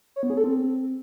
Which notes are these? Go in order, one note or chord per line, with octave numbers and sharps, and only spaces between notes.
C#5
B3
G#4
A4
C4